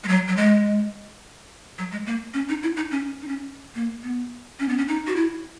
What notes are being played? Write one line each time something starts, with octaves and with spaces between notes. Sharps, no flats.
G#3
F#3
F#3
G#3
F#3
G#3
A#3
C#4
D#4
E4
D#4
C#4
D#4
C#4
A#3
B3
C#4
B3
C#4
D#4
F#4
E4